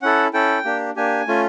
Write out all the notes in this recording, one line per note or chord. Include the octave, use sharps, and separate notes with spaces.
C#4 E4 A4 F#5
C#4 E4 A4 G5
A#3 D4 G4
A#3 D4 G4 G#5
A3 C#4 F4